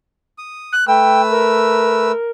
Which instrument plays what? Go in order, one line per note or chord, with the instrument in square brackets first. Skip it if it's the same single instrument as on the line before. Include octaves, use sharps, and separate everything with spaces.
[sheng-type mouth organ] D#6
[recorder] F#6
[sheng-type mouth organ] A3 B4 E6 [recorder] G5
[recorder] A#4